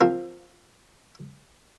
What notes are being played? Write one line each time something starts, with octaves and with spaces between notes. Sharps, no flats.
F3 C4 A#4